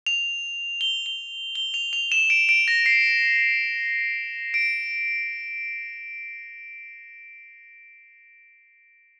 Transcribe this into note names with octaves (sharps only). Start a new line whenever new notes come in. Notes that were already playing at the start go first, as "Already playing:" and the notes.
F7
G7
G7
G7
F7
F7
E7
D7
D7
A#6
C7
D7